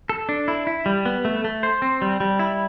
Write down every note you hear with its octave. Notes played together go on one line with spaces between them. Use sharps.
A4
D4
E4
E4
G3
B3
A3
A3
C5
C4
G3
G3
E4